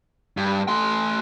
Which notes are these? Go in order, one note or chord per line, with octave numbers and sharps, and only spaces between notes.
G2
A3 C6